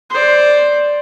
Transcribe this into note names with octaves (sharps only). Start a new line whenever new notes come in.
C5 D5